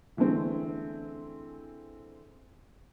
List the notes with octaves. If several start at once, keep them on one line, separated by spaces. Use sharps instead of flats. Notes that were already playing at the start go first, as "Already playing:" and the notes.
D3 E3 G#3 A3 C4